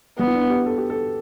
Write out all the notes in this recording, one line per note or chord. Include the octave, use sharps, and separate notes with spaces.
G3 B3
E4
D4
G4
A4
G4
A4